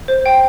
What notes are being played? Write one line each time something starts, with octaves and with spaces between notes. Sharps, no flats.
C5
G5